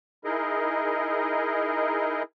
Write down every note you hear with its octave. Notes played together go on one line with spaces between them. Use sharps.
D#4 E4 G#4 A#4 D#5